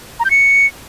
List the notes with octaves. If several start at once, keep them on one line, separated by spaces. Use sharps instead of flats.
A#5
G6
C#7